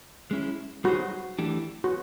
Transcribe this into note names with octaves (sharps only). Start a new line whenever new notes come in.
G#3 C#4 E4
G3 B3 D#4 F#4 G#4 C5
E3 A3 D4 G4
F#4